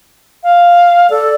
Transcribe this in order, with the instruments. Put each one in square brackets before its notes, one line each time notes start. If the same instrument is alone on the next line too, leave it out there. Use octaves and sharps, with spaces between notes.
[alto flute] F5
[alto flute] A4 [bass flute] D5